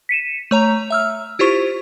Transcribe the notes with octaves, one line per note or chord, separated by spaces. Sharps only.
B6 C#7 D#7 E7
A3 C#5 A#5 F7
E5 E6 F6
E4 F4 G4 C5 C#6